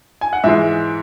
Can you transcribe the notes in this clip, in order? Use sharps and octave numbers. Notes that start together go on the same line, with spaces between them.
G#5
F#5
G#2 E3 G#3 E5